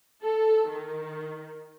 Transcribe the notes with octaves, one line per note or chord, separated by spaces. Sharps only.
A4
D#3